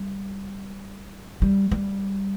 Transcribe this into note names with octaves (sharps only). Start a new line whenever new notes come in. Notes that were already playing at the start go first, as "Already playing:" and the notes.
Already playing: G3
G3
G3